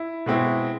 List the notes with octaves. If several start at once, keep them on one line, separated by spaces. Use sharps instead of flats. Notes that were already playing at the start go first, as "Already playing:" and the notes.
Already playing: E4
B2 G#3 C4 E4